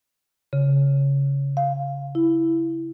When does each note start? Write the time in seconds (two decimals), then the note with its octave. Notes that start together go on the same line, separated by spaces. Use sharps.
0.53 C#3
1.57 F5
2.15 E4